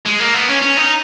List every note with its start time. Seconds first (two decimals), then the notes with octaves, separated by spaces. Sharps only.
0.05 G#3
0.20 A#3
0.34 B3
0.48 C#4
0.62 C#4
0.77 D#4